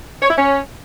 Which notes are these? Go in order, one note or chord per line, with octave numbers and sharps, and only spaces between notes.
C#5
E4
C#4